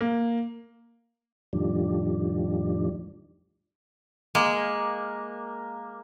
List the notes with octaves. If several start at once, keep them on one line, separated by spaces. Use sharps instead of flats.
A#3
F2 A2 D#3 F3 G3 D4
G#3 A#3